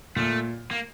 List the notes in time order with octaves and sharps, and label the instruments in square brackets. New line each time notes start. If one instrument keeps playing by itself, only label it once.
[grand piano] A#2 [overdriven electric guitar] A3
[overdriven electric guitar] A#3